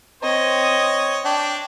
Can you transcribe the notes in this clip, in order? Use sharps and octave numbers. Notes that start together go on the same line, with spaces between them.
C4 C#5 D#5
D4 G5